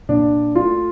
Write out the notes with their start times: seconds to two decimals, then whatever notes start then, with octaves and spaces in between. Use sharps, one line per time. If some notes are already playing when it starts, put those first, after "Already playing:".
0.09 A#2 D4
0.55 A3 F4